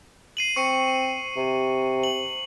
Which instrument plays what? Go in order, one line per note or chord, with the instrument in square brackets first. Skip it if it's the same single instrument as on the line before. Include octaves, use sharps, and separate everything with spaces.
[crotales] C7 D#7 F#7
[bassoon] C4 [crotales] C#6 C#7
[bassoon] C3
[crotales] F#7